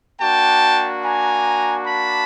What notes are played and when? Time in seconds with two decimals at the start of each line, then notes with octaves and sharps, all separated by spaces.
0.21 A#3 D4 F#4 G5 A5
1.05 G#5 A#5
1.87 A5 B5